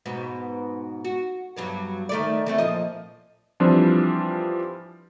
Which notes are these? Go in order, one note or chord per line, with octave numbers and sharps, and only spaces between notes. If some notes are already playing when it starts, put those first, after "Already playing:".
G#2 B2 B3
F#4
G2 F#3 B3
D#3 A3 D5
E3 A3 C4
A#2 F3 D#5
E3 F3 G3 C4 D4 F4